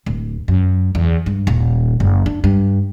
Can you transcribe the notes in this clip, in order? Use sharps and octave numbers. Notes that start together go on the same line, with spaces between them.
D1
F#2
E2
G2
D#1
F#1
D4
G2